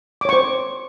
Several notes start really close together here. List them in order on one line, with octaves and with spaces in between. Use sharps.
D6 C#5 C#6 C5